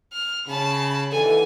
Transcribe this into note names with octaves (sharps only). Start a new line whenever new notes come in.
F6
C#3 A5 B5
D#2 D3 E3 A4 G#5